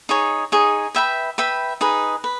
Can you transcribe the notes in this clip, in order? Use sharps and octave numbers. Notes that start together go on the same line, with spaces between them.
D#4 G#4 C#5
D#4 G#4 C#5
B4 E5 G5 B5
B4 E5 G5 B5
D#4 G#4 B4
B4